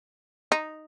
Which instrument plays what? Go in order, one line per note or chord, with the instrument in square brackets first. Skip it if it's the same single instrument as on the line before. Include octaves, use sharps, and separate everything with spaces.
[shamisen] D#4